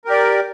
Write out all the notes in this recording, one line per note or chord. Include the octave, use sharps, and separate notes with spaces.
G4 A#4 D5